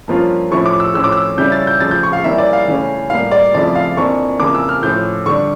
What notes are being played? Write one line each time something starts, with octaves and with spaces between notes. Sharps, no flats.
G2 F3 A#3 C#4 F4
A2 F3 C#4 E4 C#6
D6
E6
A2 F3 C#4 E6
D6
E6
C#3 G3 C#4 E4 G6
A6
G6
C#3 F3 A3 A6
G6
C#6
F5
E3 G3 A#3 C#4 E4 E5
D5
F5
C#3 E3 A3 C#4
A2 G3 A#3 F5
D5
F2 C#3 F3 A3 E4 D5
F5
F2 E3 A#3 D4 F4 C#6
F2 C#3 E3 A#3 D6
E6
F6
A2 F3 C#4 G6
D3 G3 D4 C#6